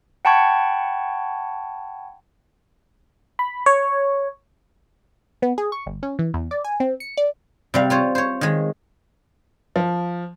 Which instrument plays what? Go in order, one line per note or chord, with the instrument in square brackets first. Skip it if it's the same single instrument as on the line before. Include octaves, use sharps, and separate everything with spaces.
[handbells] F#5 G5 A5 B5 C#6 G#6
[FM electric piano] B5
C#5
[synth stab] B3
G#4
C#6
G1
C#4
E3
E2
D5
G#5
C4
C#7
D5
[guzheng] C3 G3 F5
F4 C5 C#5
C5 C#5
D#3 G#3
[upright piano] F3